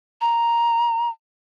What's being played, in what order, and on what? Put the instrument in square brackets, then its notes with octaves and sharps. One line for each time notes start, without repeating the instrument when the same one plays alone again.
[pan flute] A#5